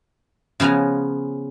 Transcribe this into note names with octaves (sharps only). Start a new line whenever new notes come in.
C#3 F3 B3 G#5 A#5